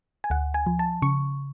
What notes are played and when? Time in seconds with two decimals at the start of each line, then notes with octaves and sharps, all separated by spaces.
0.24 G#5
0.30 D2 F#5
0.54 G#5
0.67 F3
0.79 A5
1.02 C#3 C#6